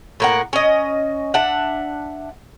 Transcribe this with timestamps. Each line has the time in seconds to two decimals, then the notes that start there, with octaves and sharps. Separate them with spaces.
0.20 A2 A#3 F#5
0.53 C#4 D#5
1.34 D4 E5 F#5